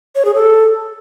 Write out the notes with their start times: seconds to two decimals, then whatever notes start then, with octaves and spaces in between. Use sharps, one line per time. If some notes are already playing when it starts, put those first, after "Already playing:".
0.15 C#5
0.25 G#4
0.35 A4